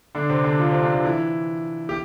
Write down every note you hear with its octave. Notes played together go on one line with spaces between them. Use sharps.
D3 D4
C3 C4
D3 D4
F3 F4
C3 C4
D3 D4
D3 D4
E3 E4
G4